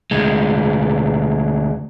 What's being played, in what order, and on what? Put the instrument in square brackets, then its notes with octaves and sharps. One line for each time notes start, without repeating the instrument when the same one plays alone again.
[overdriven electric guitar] D2 G#3